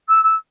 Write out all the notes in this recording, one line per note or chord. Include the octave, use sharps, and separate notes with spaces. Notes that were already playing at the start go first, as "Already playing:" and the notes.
E6
E6